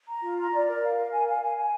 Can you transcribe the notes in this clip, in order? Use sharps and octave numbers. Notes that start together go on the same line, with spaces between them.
A#5
F4
A#5
D5
A#4
F5
A#4
G#5
F5
G#5
G#5